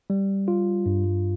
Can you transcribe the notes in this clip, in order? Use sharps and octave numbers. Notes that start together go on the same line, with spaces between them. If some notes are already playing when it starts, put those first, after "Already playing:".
G3
F4
G2